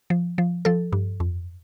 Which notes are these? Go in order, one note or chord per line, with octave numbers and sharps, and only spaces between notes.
F3
F3
F3 A4
G2
F2